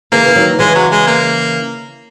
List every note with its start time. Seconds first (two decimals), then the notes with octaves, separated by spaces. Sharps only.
0.12 C#3 E3 A#3
0.28 E3
0.36 D#3 F#3
0.59 C#3 E3 G#3
0.75 F#3
0.92 G#3
1.07 A#3